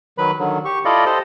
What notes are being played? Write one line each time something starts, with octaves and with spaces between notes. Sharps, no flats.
D#3 F#3 B4 B5
D3 D#3 F#3
G4 C#6
E4 F4 A4 D5 D#5 F5
G4 A4 C5 D#5